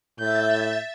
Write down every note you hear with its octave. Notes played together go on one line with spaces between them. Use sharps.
A2 E5 G6 A6